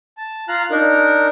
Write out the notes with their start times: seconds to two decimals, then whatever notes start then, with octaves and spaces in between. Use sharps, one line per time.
0.17 A5
0.48 F4 F5 A#5 F#6
0.71 D4 D#4 A#4